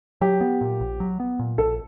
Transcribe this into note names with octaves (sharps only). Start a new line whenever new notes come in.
F#3 G4
B3
A#2
A#1
F#3
B3
A#2
A#1 A4